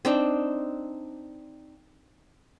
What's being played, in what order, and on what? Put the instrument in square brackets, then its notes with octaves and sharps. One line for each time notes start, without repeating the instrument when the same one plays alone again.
[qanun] C4 D4 D#4